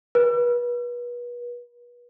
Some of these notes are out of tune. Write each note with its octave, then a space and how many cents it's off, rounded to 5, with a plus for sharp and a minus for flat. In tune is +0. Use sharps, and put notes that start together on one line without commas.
B4 -35